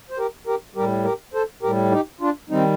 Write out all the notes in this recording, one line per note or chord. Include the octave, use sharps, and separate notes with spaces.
C5
G4 A#4
G4 A#4
A2 G3 G4 A#4
G4 A#4
A4 C5
A2 G3 G4 A#4
D#4 G4
D4 F4
D#3 G3 C4 D#4